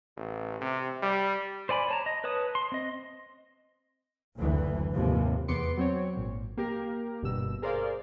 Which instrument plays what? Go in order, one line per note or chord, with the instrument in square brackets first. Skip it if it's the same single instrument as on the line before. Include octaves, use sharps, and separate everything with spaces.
[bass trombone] A1
C3
G3
[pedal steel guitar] C5 D5 G#5 B5
C#5 A5 A#5
D#5
B4 C#5 A5 D#6
C6
C4 D#5
[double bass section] F#1 D2 E3
D#2 G#2 C3 E3 F3
[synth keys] E2 B3 C6 D6 C#7
F#3 C4 C#5
G#1 A#2
A#3 G4 A#4
G1 G2 B2 E6
G#4 A#4 C5 D5 F5